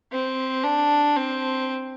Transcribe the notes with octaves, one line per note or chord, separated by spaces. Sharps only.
C4
D4
C4